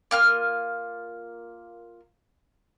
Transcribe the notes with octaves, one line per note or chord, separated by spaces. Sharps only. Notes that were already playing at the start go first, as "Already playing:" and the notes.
A#3 F4 F6